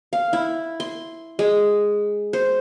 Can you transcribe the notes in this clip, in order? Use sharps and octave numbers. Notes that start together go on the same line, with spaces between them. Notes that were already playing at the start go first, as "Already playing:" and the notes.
F5
E4
C6
G#3
C5